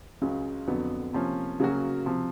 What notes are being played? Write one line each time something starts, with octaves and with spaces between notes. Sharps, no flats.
C#2 C#3 F#3
F2 D3 F#3 B3
C3 F3 A#3 C#4
C#3 F#3 A#3 C#4 F#4
C3 F3